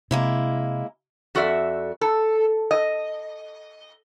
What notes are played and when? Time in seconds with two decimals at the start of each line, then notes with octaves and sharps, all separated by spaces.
0.11 C3 G#3 A#3 E4
1.35 F2 F#4 A4 D5 E5
2.01 A4
2.71 D#5